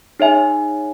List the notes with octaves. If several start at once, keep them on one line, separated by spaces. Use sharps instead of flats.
D#4 G#4 C#5 E5 G#5